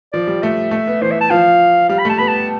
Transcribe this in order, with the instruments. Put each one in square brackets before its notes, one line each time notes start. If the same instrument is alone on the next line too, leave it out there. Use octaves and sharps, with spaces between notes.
[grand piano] F3 [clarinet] D5
[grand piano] G3
[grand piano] A3 [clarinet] E5
[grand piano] A3
B3
[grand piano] E3 [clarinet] C5
[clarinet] E5
A5
[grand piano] F3 [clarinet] F5
[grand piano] G3 [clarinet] F5
[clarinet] B5
[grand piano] A3 [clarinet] A5
[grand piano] B3 [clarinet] B5
[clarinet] A5